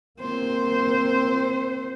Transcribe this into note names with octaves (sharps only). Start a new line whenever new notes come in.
A#3 C4 C5